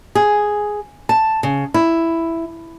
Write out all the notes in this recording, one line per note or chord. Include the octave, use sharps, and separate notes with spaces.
G#4
A5
C#3
E4